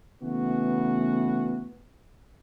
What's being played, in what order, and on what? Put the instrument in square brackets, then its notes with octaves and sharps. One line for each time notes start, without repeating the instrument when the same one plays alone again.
[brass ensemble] C#3 E3 A3 B3 F#4